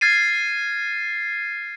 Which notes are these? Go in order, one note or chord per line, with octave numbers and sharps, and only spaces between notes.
F6 G#6 A6 C7 D#7